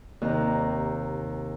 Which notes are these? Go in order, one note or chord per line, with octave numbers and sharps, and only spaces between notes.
D#2 C3 A#5